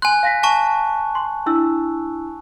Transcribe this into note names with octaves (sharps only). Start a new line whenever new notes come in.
G#5 C6 F#6
F5 A#6 B6
G#5 A5 C#6
C6
D4 E4 E6